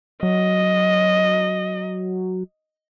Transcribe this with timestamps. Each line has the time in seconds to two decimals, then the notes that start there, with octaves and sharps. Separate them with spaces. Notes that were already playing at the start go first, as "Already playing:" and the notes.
0.23 F#3 D#5